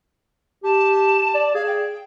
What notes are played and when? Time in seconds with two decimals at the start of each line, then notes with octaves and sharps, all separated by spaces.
0.64 G4 A5
1.35 D5
1.55 G#4 F5
1.67 G5